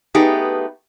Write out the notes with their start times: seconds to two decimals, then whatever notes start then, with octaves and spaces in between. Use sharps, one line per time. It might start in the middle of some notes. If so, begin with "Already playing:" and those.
0.14 A3 B3 D#4 G4 G#4 B4